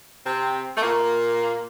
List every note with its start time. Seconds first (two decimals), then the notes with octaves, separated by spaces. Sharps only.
0.25 C3 C4
0.76 A3
0.82 A#2 A#3